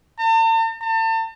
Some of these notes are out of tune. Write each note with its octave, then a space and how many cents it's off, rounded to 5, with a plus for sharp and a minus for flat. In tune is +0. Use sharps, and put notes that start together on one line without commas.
A5 +45
A5 +40